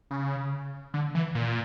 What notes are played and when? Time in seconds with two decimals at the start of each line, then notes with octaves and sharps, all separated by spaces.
0.11 C#3
0.94 D3
1.15 E3
1.35 A#2